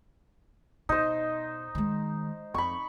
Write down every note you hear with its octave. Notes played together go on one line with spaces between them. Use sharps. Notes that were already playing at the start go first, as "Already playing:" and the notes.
B2 D#4 C5
D#3 G#3
F2 B5 C#6